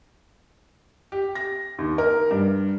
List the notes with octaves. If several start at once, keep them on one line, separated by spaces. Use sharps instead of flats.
G4
A#6
D#2
A#4
G2